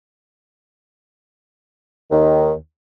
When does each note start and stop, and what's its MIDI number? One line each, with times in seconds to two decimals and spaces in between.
2.12 2.53 39
2.12 2.53 51